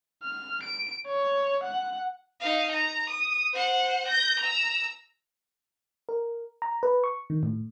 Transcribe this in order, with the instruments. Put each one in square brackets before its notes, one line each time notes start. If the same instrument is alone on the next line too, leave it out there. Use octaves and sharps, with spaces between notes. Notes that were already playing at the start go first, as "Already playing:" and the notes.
[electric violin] F6
D7
C#5
F#5
[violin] D#4 F5
A#5
D#6
C5 F#5
G6 A#6
A#5 E6
[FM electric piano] A#4
A#5
B4
C#6
D#3
A2